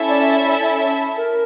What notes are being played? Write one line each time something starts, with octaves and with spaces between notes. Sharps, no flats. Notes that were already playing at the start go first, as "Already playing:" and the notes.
Already playing: C#4 E4 A4 E5 A5
D5
A#4